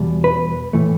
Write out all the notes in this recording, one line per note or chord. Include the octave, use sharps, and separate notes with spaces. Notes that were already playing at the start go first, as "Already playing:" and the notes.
Already playing: E2 B2 G3
B4
A2 E3 A3